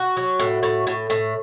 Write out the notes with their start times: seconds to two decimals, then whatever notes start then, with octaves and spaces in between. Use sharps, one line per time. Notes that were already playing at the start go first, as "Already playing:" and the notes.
Already playing: F#4
0.17 F#3
0.39 A2
0.63 A2
0.87 A2
1.10 A2